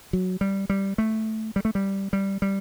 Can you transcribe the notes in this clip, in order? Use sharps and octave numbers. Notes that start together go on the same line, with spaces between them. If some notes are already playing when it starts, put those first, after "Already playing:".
F#3
G3
G3
A3
G3
A3
G3
G3
G3